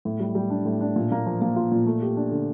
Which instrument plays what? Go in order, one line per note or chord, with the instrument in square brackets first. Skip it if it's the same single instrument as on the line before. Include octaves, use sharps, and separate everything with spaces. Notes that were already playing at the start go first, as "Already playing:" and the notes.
[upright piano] A2
G3
G3
D4
A2
D4
A#2
A#3
F3
A#3
F4
A#2
A3
G4
D4
D3